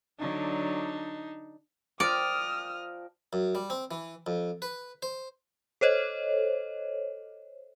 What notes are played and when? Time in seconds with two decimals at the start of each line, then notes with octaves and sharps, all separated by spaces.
0.19 D3 F#3 D4 D#4
2.00 F3 A#4 D5 G5 D#6 F6
3.33 F#2
3.55 G3
3.70 C4
3.91 E3
4.27 F2
4.62 B4
5.02 C5
5.81 A4 C5 C#5 D#5